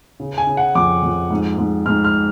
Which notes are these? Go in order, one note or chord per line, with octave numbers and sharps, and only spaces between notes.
C#3
G#5
C#3
F#5
F2 D6
F2
G#2
G#2
G#2 F6
F6